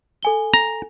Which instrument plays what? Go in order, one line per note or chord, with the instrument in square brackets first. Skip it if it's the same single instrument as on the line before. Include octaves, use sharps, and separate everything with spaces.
[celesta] A4 G#5 G7
[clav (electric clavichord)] A#5